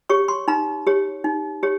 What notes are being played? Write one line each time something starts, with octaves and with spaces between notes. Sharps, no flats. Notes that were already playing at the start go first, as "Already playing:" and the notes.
G4 C#5 C#6
C6
D#4 A#5
G4 C#5
D#4
G4 C#5